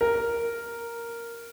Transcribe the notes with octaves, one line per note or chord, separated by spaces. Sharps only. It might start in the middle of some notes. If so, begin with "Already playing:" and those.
A#4